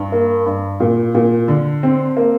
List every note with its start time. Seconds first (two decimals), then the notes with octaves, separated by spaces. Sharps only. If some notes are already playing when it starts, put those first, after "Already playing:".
Already playing: G2
0.12 A#3
0.46 G2
0.80 A#2
1.15 A#2
1.48 D3
1.83 C4
2.17 A#3